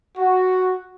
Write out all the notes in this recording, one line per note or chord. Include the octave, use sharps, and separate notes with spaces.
F#4